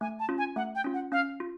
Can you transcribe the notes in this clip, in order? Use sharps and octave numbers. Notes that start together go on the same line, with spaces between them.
A3 G#5
A5
C#4 F4
G#5
A3 F#5
G5
C#4 F4
F#5
C#4 F5
F4